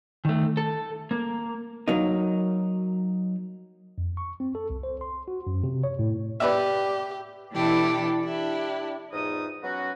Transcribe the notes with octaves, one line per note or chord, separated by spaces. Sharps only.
D#3 A3
A4
A#3
F#3 A#3 D#4
F2
C#6
C4
A4
C2
C5
C6
F#4
F#2
C3
C#5
A2
G4 B4 D5 E5
B2 E3 D4 E4 G4 A4
D4 E4 G4
E2 G#2 D#4 F4 D#6
F#3 B3 C#4 F#4